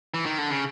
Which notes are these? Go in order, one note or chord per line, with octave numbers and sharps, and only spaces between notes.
E3
D#3
D3
C#3